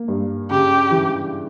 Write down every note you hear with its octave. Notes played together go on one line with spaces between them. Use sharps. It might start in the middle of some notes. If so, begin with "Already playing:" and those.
Already playing: A#3
G2
C#3 G4
E3